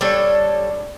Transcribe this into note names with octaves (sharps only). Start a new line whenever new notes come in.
G3 D4 A4 C#5